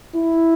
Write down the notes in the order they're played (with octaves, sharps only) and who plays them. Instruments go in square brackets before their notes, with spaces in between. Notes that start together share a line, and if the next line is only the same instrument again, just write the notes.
[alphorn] E4